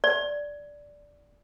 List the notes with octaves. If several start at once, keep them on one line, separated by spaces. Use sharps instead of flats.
D5